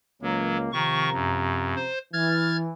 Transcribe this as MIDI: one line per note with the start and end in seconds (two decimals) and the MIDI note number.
0.22 0.69 37
0.22 0.57 54
0.22 0.69 58
0.72 1.87 48
0.72 1.09 51
0.72 1.87 53
0.72 1.87 82
0.72 1.09 85
1.13 1.74 42
1.76 1.98 72
2.13 2.70 52
2.13 2.57 89
2.13 2.57 92
2.13 2.57 93